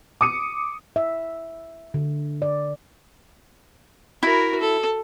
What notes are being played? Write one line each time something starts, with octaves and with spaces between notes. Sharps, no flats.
D6 D#6 C#7 D#7
E5
D3
D5
E4 F#4 A#4
A4